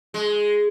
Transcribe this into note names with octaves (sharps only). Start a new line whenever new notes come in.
G#3